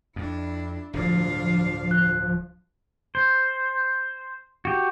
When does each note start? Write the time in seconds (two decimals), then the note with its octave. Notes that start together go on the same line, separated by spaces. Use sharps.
0.16 F2 D4 E4
0.94 D1 G2 F3 D4 F5
1.91 F#6
3.15 C5
4.65 F#4 G4